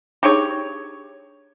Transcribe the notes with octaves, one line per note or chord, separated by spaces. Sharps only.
D4 D#4 G4 G#4 C#5